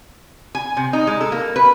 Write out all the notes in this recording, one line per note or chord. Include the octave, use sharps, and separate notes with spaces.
G#5
C3
D#4
G#3
A4
A#3
B4